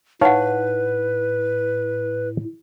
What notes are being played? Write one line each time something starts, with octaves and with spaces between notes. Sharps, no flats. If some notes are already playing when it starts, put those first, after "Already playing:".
A2 D#4 B4 C#5 F5 F#5